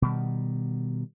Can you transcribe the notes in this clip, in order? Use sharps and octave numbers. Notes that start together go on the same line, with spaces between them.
B2 D#3 G3